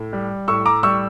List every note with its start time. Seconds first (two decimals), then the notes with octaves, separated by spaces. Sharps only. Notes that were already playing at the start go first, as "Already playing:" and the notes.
Already playing: A2
0.13 G3
0.48 A2 C#6 E6
0.65 A#5 D6
0.83 G3 C#6 E6